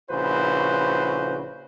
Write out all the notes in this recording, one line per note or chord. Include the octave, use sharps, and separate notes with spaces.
A#1 C#3 E4 F#4 B4 C5